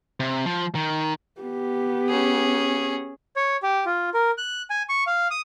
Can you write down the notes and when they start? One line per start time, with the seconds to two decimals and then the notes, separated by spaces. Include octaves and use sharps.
0.20 C3
0.46 F3
0.75 D#3
1.41 B3 G4
2.09 C#4 G#4
3.36 C#5
3.63 G4
3.86 F4
4.14 A#4
4.38 F#6
4.70 G#5
4.89 C#6
5.07 F5
5.31 D#6